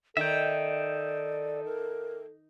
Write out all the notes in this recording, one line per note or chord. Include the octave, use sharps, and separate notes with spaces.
D#3 A4 D5 E5 G5
A#4